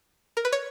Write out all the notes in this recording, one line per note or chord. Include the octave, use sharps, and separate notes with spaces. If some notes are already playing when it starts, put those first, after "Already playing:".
A#4
B4
C#5